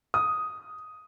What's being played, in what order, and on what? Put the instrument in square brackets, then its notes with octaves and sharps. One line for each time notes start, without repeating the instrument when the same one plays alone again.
[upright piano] D#6